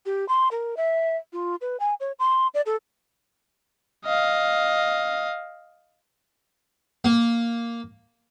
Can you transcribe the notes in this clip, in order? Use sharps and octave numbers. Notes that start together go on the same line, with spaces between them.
G4
C6
A#4
E5
F4
B4
G#5
C#5
C6
D5
A4
D#5 F5
A#3